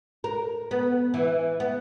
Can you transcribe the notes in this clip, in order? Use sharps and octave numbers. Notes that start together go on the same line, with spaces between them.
A#4
B3
E3
B3